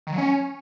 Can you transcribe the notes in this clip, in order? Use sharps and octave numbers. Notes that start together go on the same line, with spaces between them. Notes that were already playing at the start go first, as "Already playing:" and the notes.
D#3
F#3
C#4